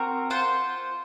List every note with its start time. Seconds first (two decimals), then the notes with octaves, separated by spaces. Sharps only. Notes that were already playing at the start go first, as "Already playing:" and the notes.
Already playing: C4 F#4 A#4
0.30 F4 C5 F#5